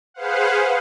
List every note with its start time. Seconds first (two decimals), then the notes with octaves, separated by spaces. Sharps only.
0.14 G#4 B4 C5 F5 F#5